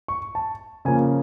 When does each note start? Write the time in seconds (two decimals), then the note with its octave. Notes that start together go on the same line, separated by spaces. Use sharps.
0.08 C#6
0.35 A5
0.85 C#3 F3 A#3 G#5